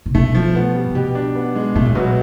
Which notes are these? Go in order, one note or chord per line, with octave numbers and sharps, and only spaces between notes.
C3
B2 A3
F3
B3
G3
C3
B2 G4
D4
B3
G#3
B2 A3
A#2
B2 F#3